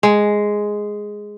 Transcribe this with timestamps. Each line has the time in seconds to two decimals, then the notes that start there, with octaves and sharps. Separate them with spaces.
0.03 G#3